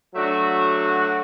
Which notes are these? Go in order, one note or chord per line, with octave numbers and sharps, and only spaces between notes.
F#3 A3 D4 F#4